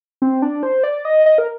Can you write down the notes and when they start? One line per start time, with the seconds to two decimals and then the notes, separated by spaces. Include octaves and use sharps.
0.22 C4
0.42 D4
0.63 C5
0.84 D5
1.05 D#5
1.26 D#5
1.38 A#4